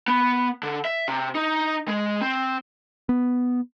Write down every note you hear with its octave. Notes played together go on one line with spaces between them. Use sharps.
B3
D3
E5
C3
D#4
G#3
C4
B3